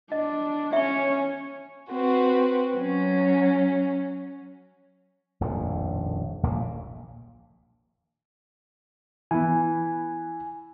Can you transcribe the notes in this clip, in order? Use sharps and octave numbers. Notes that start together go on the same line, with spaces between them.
D4 D#5
C#4 C#5 E5 C#6
C4 F#4 B4
F#3 C#4
D#1 A#1 F2 A2
D#1 A#1 A#2 A#3
E3 B3 G#5